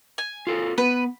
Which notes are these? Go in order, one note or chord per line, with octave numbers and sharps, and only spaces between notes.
G#5
F4 A4 A#4
B3 B4